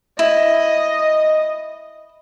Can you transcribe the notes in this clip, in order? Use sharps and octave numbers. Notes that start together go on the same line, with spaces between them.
E4 D#5